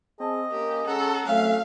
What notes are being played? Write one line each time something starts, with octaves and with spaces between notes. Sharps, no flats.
C4 G#4 D#5 A5
A#3 C#4 G4
G#3 C#4 A4 F#5 A#5
F#3 A3 C4 C#4 E5 F5 F#6